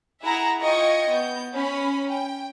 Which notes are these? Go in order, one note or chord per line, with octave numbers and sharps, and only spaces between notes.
E4 G#4 E5 F#5 A#5
F4 D#5 G5 C#6 G#6
B3 G6
C#4 B5
G5